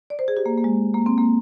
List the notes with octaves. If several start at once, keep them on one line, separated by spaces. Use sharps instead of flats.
D5
C5
G#4
G4
A#3
A#3
G#3
A#3
C4
A#3